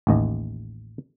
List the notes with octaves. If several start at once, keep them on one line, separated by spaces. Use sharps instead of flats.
A1 D#2 D#5